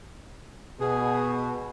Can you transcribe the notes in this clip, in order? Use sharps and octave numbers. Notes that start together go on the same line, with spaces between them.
B2 G#4